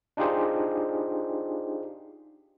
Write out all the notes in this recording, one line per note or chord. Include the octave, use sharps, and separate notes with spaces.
D4 D#4 F4 G4 G#4 C5